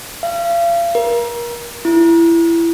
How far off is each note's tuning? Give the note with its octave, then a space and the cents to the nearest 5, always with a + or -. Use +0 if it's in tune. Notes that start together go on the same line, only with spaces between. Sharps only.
F5 -35
A#4 +30
E4 +20